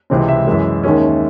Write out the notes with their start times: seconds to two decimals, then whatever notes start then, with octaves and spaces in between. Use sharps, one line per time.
0.10 C#2 C3 E3 G#3 C4
0.28 E5
0.47 F#2 E3 G#3
0.84 D#2 D#3 G#3 C#4